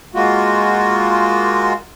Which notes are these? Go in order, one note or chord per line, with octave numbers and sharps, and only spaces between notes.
G#3 A#3 F4 F#4